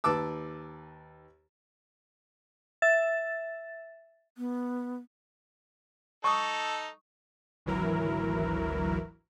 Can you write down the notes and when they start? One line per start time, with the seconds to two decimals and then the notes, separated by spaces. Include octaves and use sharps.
0.04 D#2 B4 A5 D6 E6
2.82 E5 A6
4.38 B3
6.24 D#4 A4 C#6 D#6
7.66 G#1 D2 E3 F#3 E4 A#4